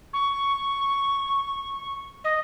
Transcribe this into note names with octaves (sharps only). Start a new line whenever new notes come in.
C#6
D#5